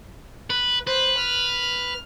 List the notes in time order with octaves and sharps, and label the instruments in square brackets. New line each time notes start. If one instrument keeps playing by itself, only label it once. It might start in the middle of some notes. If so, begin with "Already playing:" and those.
[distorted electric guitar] B4
[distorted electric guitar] B4 [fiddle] C5
[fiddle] F6